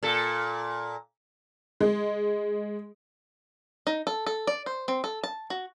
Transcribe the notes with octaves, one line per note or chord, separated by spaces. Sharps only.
A#2 A4
G#3
D#4
A4
A4
D5
C5
C4
A4
A5
F#4